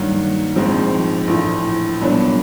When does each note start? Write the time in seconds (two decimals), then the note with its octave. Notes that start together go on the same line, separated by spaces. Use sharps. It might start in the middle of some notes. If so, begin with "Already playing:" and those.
Already playing: G2 D#3 F#3 A#3
0.55 A#1 G#2 F3 G#3 C4
1.27 A#1 A2 E3
2.01 C2 A#2 F#3 B3 D4